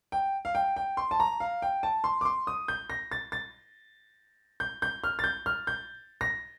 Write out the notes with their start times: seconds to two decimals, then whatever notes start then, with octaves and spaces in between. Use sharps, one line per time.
0.12 G5
0.45 F5
0.55 G5
0.76 G5
0.97 C6
1.11 A5
1.20 A#5
1.40 F5
1.62 G5
1.83 A5
2.04 C6
2.21 D6
2.25 C6
2.47 D#6
2.68 G6
2.90 A#6
3.12 A6
3.32 A6
4.60 G6
4.82 G6
5.04 F6
5.19 A6
5.24 G6
5.46 F6
5.67 G6
6.21 A#6